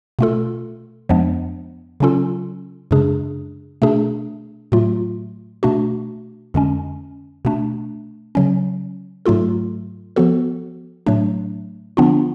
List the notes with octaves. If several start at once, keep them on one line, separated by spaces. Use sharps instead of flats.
B2 A3 F4 A4
F2 F3 G#3 B3 D4
C#3 F#3 C#4 F4 A4
F#2 C#3 G#3 D4 G#4
B2 A3 D4 G#4
A2 F#3 A3 F4
B2 A3 D4 F#4
F2 D3 G#3 C#4
B2 A3 D4
C#3 F#3 C#4
G#2 F#3 A3 F4 A4
F3 B3 F#4 A4
A2 F#3 A3 D4
D3 F3 B3 D4 F4